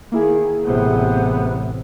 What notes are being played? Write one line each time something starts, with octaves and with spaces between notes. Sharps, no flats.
D#3 A#3 E4 G#4
A1 C3 B3